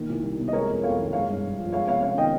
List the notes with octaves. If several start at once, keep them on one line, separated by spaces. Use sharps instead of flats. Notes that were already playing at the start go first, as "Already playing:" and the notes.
Already playing: A#2 D#3
C2
G3
C3
D#5
G#3 A#4 C#5
F2
F2 C#5 F5
D#3
G#3 C#5 F5
G2
G2
F3
G#3 C#5 F5
C3 C#5 F5
C#4 C#5 F5
D#3 D#5 G5